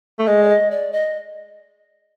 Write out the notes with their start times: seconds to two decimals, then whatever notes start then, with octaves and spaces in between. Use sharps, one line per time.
0.19 A3
0.26 G#3 D#5
0.43 D5
0.49 D#5
0.71 D5
0.93 D#5